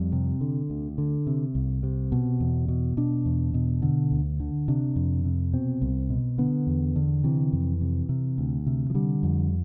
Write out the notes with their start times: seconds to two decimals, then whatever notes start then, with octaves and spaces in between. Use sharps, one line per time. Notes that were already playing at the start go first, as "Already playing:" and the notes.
Already playing: F2 G3
0.12 C3
0.41 D3
0.70 D2
0.98 D3
1.27 C3
1.55 C2
1.83 C3
2.12 B2
2.40 E2
2.68 B2
2.97 B2 D4
3.26 E2
3.54 B2
3.82 D3
4.11 D2
4.40 D3
4.68 C3 D4
4.96 F2
5.25 C3
5.53 B2 C4
5.82 C2
6.10 B2
6.38 D3 B3
6.67 E2
6.96 D3
7.24 C3 E3
7.53 F2
7.81 C3
8.09 C3
8.38 D2
8.67 C3
8.90 F3
8.94 D3 G3
9.23 F2